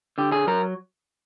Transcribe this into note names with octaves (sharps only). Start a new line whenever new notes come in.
D3 G4
G#4
F#3 A#4